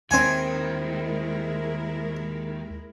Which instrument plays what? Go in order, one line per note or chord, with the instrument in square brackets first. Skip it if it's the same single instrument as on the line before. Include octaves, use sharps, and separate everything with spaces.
[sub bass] D#2 [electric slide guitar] D#3 [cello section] G#3 E4 A#4 [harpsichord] C4 G#5